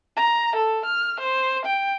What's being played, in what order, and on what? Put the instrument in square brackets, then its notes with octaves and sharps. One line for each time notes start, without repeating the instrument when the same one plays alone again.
[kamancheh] A#5
A4
F6
C5
G5